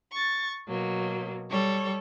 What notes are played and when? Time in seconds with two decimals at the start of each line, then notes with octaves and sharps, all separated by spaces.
0.13 C#6 A6
0.67 B2 F#3 A#3
1.50 G3 A4 C#5